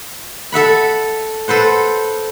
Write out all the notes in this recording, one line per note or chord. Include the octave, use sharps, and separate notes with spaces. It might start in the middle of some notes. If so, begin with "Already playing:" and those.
A4 E5 F#5 B5
A4 B4 C5 F#5